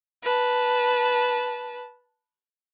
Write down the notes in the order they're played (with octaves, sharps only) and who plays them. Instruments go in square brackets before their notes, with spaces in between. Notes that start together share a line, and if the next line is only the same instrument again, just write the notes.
[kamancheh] B4 A5